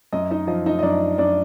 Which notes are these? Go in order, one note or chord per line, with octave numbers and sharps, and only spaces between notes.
F#2 D#5
D#4 D#5
F3 D#5
D#4 D#5
D#5
F#2 D4 D5
F#2 D4 D5